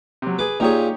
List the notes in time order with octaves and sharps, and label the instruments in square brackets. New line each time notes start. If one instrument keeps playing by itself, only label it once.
[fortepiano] C3 F#3
[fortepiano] G#4 B4 [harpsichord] D6
[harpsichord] A#2 G#4 [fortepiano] D#4 G4 C#5